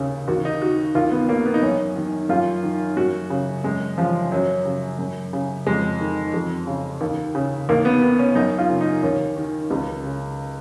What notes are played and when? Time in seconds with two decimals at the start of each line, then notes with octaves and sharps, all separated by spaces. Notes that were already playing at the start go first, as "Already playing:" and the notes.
Already playing: D#2 C#3
0.28 D#2 F#4
0.45 D#4
0.61 D#3 F#4
0.95 D#2 F4
1.12 B3
1.28 D#3 A#3
1.46 B3
1.54 D#4
1.62 F#2 C#4
1.96 D#3
2.29 F#2 F4
2.63 D#3
2.97 F#2 F#4
3.30 C#3
3.64 F#2 G#3
3.98 C#3 F3
4.32 F#2 F#3
4.65 C#3
4.99 F#2
5.33 C#3
5.66 F2 G#3
6.00 D#3
6.34 F2
6.67 C#3
7.01 D#2
7.35 C#3
7.69 D#2 A#3
7.85 B3
8.02 D#3 B3
8.19 C#4
8.35 F#2 D#4
8.59 F4
8.69 C#3
8.81 D#4
9.03 D#2 C#4
9.37 D#3
9.71 C#2
10.04 C#3